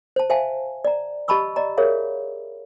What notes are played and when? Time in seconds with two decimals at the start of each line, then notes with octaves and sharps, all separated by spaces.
0.16 C5 A5
0.30 C5 E5 F5 G#5 A5
0.85 D5 A#5
1.28 G4 D#5 A5 B5 C#6 E6
1.56 D5 D#5 A#5
1.77 G#4 A#4 C#5 E5 F5